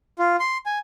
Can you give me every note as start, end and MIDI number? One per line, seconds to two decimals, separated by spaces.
0.19 0.36 65
0.40 0.57 84
0.66 0.79 80